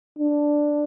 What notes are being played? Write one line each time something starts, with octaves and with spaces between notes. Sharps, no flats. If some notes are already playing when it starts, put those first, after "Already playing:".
D4